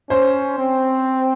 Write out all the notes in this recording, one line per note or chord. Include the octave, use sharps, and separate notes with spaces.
C#4 C5
C4